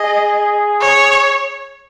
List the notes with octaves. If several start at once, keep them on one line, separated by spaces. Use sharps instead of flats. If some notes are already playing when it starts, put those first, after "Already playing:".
Already playing: G#4 D#5
C#5